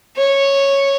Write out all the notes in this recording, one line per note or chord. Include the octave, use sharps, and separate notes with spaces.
C#5